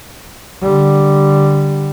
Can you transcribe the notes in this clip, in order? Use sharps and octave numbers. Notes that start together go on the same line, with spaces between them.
D3 G3